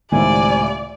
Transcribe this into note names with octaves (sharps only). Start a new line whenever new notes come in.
C#2 A2 C3 D#3 D5 G#5